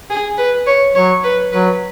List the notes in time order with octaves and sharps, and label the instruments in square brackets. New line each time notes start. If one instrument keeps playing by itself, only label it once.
[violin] G#4
B4
C#5
[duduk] F#3 [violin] C#5
[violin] B4
[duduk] F#3 [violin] B4